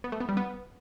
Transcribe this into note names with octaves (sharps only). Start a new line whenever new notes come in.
B3
A3
B3
G3
B3